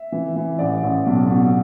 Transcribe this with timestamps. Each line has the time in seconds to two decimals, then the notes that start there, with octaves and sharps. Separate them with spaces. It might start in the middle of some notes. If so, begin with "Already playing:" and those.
Already playing: E5
0.12 E3
0.36 E3
0.59 A1 D5
0.83 A1
1.06 B1
1.29 B2